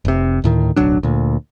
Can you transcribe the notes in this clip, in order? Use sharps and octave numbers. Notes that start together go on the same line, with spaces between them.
F1 C3
D2 A2 D#3
D1 B1 F#3 D4
D2 A#2